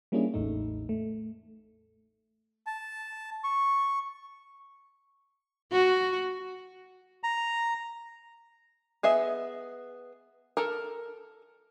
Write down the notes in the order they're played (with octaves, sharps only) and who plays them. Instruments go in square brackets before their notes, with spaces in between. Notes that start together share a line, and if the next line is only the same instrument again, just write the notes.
[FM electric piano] G3 A#3 C#4 D4 E4 G#4
A1 E2 A2 A3 D#4
A3
[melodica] A5
C#6
[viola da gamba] F#4
[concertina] A#5
[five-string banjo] B3 G#4 D#5 E5
A4 A#4